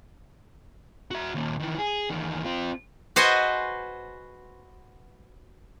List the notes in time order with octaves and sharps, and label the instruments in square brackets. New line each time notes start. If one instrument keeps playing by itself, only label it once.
[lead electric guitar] F#4 E5
D#2 A#2
D#3 E3
G#4
E2 D#3
C4 F4
[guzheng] F#4 B4 C5 D#5 F#5 G#5